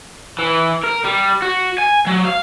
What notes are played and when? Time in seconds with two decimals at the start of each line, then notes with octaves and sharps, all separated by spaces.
0.39 E3
0.83 A#4
1.04 G3
1.42 F#4
1.78 G#5
2.07 F#3
2.25 F5